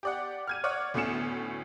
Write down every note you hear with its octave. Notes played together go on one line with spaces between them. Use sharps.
G4 D5 F#5
F6 G#6 D#7
C#5 D5 F#5
D2 A2 B3 C#4 C#7 E7